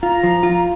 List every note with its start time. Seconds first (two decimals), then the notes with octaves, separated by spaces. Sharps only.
0.03 F4 A#5
0.23 F3
0.43 F4